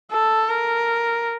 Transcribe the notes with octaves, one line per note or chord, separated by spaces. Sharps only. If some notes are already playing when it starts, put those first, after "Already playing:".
A4
A#4